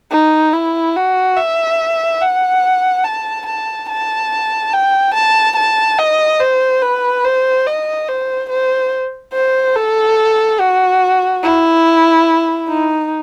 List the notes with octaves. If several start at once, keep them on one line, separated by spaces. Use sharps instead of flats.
D#4
E4
F#4
E5
F#5
A5
A5
A5
G5
A5
A5
D#5
C5
B4
C5
D#5
C5
C5
C5
A4
F#4
E4
D#4